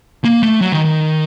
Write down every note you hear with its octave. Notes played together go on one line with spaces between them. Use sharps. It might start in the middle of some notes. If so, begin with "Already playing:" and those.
A#3
A3
F#3
D#3
D#3